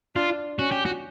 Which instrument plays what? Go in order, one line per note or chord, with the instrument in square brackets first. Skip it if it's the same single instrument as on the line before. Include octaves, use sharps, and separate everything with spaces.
[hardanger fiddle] D4 [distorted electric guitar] F4
[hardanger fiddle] C#4 [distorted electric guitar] F#4
[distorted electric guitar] G4
F#4